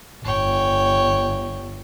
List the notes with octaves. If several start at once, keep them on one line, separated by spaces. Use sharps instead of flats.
G1 C#5 G5